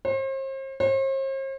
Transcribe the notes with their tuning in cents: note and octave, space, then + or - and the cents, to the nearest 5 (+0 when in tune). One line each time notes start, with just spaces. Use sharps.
C5 +40
C5 +45